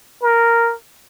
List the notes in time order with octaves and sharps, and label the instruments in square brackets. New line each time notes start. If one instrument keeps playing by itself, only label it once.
[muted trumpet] A#4